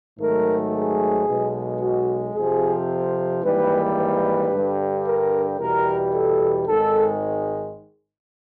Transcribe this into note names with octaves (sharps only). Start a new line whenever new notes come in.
G#1 G#2 D#3 F#3 A3 A#4
G#4
B1 B2 G#3
F#4
F2 C3 F3 G#4
G#1 G#2 E3 G3 A#3 B4
B4
G2 D3 G3
A#4
E2 B2 G3 A#4
A4
G#1 G#2 D#3 G#3 A4